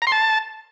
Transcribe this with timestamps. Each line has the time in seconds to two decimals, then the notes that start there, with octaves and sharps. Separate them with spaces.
0.02 A#5
0.07 C6
0.12 A5